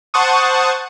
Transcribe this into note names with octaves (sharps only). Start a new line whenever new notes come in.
C5 F#5 A5 C#6 D#6